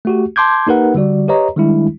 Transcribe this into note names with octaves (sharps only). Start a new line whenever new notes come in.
A3 F#4 G4
A5 C6 D6 G6 G#6
A#3 D#4 G4 A#4 B4 F#5
D3 G3 F#4 D5
G4 B4 C#5 D#5 A#5
D#3 G3 G#3 D4 E4